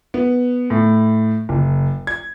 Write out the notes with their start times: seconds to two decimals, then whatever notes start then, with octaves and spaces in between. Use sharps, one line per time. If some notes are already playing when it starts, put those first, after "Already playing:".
0.14 B3
0.70 A2
1.49 F#1
2.07 G#6